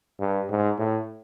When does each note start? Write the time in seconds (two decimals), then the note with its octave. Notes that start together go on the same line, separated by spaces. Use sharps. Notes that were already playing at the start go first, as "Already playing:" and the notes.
0.20 G2
0.50 G#2
0.79 A2